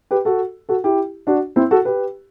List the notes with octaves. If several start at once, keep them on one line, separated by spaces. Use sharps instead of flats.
G4 B4
F#4 A4
F#4 A4
E4 G4
D4 F#4
C4 E4
F#4 A4
G4 B4